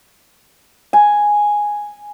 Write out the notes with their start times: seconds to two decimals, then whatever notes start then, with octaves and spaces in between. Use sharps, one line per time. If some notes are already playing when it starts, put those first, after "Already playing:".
0.93 G#5